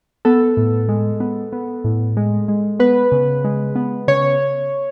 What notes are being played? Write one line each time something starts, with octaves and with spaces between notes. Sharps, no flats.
B3 A4
A2
G#3
B3
B3
A2
G#3
G#3
B3 B4
C#3
G#3
B3
C#3 C#5